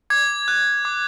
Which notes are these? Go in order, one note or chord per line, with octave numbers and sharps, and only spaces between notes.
D6 G#6
F#6
D6